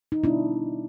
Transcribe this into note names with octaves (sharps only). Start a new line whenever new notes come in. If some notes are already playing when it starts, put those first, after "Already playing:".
D#4
B2 G3 B3 D4 E4